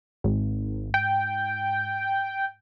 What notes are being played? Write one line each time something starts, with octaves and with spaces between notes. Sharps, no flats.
G#1 G#2
G5